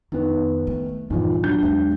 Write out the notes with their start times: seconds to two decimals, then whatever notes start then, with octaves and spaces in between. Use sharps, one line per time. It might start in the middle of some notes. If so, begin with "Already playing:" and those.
0.12 F2 D#3 B3
0.67 A3
1.10 E2 G2 A#2 D#3 F3
1.43 F#3 D4 G6
1.63 E2 G#3